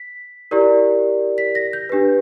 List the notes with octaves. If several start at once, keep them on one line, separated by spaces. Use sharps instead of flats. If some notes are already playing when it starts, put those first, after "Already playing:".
Already playing: B6
E4 G4 A#4 D5
B6
A#6
G6
D4 G4 B4